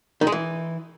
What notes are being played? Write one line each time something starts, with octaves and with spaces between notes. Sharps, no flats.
D#3
G#3
E3